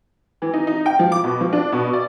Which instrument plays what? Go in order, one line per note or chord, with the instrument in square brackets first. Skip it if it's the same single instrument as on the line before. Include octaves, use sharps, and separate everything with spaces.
[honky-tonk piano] E3
D#4
D#4
G5
F3
D6
B2
F3
D4
B2
D5